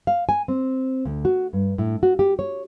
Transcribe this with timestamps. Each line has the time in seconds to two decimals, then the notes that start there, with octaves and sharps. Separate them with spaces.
0.07 F5
0.29 G#5
0.48 C4
1.05 D2
1.25 F#4
1.53 G2
1.78 A2
2.03 F#4
2.19 G4
2.39 C#5